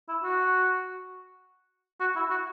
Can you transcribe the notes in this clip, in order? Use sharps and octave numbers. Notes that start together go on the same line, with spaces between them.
E4
F#4
F#4
E4
F#4